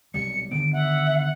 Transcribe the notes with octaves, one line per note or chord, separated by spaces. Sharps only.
B1 C3 G3 C#7
D3 D#3 B3 D7
E5 F#5